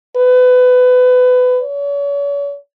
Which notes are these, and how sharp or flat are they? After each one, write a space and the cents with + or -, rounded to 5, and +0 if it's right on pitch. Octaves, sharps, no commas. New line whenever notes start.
B4 +25
C#5 +40